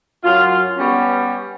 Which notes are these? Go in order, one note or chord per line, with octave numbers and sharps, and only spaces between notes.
F#2 F#3 F4
G3 B3 C#4